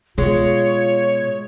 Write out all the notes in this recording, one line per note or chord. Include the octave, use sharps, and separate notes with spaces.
B2 G#3 F4 C#5